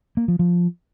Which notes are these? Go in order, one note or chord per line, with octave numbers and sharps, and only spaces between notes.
A#3
F3
F3